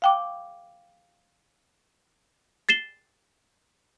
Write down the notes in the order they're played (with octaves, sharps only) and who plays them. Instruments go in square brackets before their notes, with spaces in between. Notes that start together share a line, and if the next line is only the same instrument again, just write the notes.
[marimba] F5 G5 D6
[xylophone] A6 C7 E7 G7